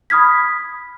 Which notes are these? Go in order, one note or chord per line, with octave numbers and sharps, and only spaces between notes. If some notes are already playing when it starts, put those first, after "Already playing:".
B5 D#6 F6 G#6 B6